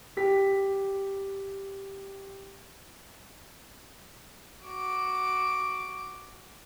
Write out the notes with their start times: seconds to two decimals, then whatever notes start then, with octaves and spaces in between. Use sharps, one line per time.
0.17 G4 B6
4.64 F#4 D6